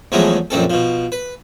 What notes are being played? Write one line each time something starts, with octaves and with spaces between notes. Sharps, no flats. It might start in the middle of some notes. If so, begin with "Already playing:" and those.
E2 F3 F#3 G#3 A3 B3
A#1 F#2 C4 A4
B2 F3
B4